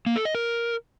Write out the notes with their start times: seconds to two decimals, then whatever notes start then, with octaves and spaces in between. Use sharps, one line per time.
0.06 A#3
0.16 A4
0.25 D#5
0.35 A#4